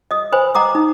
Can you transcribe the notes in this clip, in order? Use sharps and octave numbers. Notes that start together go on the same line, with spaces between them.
D#5 D#6
B4 C5 G#5 B5
D#5 F#5 A#5 D6 D#6
D#4